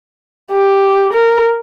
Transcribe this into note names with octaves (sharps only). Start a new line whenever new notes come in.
G4
A#4